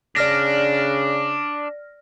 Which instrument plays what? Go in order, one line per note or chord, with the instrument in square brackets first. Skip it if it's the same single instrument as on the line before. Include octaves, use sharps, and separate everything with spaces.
[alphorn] C#3 [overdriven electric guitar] D4 [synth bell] D5 F6 A#6